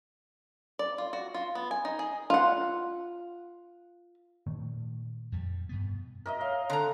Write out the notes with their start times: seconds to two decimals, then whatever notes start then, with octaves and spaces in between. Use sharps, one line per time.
0.79 D5
0.98 F4
1.13 F#4
1.34 F4
1.55 B3
1.71 G#5
1.85 D#4
1.99 G#4
2.30 F4 F#5
4.47 A#2 D#3 A3
5.32 F2 G3
5.69 G2 B2 B3
6.26 A#4 D#5 E5
6.41 C#5 F5
6.70 D3 A4 A#5